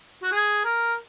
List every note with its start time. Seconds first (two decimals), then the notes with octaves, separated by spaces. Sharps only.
0.23 F#4
0.32 G#4
0.65 A#4